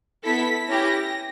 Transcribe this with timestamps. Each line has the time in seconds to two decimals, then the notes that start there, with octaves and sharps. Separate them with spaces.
0.23 B3 E4 A4 B6
0.69 C#4 E4 G4 A#6